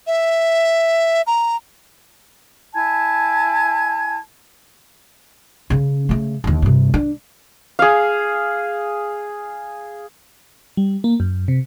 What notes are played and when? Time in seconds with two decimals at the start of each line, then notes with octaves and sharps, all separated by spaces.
0.07 E5
1.27 A#5
2.74 E4 G#5 A5 G#6
5.70 C#3 C#4
6.09 C#3 A3
6.44 D#2 D3
6.62 G2 C3
6.94 D4
7.79 G#4 F5
10.77 G3
11.04 A#3
11.20 F#2
11.48 C3